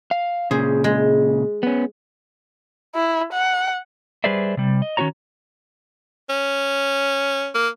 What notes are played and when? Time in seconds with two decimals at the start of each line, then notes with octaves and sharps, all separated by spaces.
0.11 F5
0.51 A#2 C#3 G#4 C5
0.84 G#3
1.63 B3 C#4
2.95 E4
3.33 F#5
4.24 G3 G#4 B4 C5 D5 E5
4.57 C3 G3
4.82 D#5
4.97 D#3 C#4 D#4 F#4 C#5 A#5
6.29 C#4
7.55 A#3